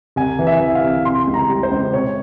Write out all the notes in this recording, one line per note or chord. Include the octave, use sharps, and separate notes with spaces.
C2 G#5
E3
E5
E3
F5
C2
C3 C6
C#2
A#5
G3
C5
C#2
C3 C#5